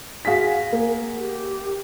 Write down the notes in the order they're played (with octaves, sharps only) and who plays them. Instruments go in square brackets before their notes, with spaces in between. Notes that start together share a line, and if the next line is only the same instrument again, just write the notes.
[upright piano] F#4 G#4 G#5 [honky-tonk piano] F5 B6
[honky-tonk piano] A#3
[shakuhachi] G4